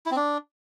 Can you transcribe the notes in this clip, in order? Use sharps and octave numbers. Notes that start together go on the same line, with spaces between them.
E4
C4
D4